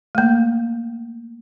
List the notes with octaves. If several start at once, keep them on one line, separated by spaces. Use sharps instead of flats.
A3 A#3